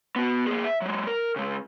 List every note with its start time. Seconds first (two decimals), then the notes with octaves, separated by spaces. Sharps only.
0.16 B3 F#4
0.47 A#3 G#4
0.64 E5
0.82 F#3 G#3
1.07 A#4
1.36 C#3 G#3